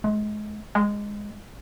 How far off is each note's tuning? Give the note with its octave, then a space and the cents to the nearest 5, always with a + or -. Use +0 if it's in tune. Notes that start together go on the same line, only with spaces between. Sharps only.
G#3 +30
G#3 -10